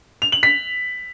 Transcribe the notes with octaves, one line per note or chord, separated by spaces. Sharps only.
F7
F#7
B6